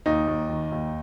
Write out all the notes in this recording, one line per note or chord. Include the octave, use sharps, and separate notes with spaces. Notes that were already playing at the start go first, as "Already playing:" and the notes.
D#2 D#4
D#2
D#3
D#2